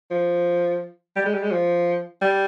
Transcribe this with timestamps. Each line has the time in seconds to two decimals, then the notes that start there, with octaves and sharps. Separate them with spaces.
0.11 F3
1.16 G3
1.26 G#3
1.34 G3
1.43 G#3
1.51 F3
2.22 G3